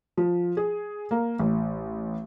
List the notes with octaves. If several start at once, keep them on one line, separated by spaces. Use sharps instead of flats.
F3
G#4
A#3
A1